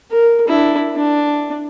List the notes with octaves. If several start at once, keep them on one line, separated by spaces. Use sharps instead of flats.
A#4
D4 E4
D4